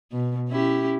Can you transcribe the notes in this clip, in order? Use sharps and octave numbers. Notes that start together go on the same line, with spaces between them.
B2
C#4 E4 G4